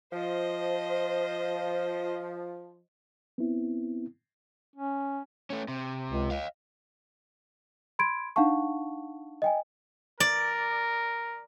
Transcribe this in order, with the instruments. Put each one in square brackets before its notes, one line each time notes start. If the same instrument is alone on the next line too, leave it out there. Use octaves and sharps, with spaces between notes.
[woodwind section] F3 [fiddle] C5 D#5
[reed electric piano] B3 C4 E4
[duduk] C#4
[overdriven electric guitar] A3 C#4
C3
[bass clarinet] C#2
[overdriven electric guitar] D#5 F5
[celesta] B5 C6 G#6 D7
D4 D#4 F5 F#5 A5 C#6
D#5 G5 G#5
[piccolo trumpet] A#4 [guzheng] D5